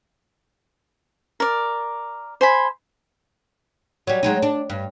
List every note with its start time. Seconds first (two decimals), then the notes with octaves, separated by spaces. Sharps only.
1.40 A#4 D5
2.41 C5 G#5 B5
4.07 F#3 G3
4.23 F#3 G#3 D#4
4.43 D4
4.70 G2